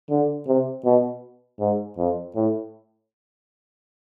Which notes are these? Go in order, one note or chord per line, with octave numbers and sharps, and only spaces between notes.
D3
C3
B2
G#2
F2
A2